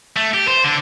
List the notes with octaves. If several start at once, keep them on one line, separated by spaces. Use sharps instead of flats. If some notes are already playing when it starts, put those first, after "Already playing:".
A3
G4
C5
D3